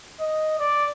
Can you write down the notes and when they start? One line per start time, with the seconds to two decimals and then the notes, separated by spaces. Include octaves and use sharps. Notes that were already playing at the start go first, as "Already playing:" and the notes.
0.20 D#5
0.59 D5